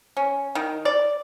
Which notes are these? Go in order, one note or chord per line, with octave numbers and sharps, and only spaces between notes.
C#4
D#3
D5